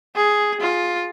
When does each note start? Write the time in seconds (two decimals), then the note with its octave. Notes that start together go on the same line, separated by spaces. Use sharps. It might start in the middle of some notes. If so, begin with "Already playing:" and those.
0.16 G#4
0.61 F4